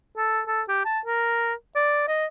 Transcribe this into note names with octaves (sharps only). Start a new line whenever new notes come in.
A4
A4
G4
A5
A#4
D5
D#5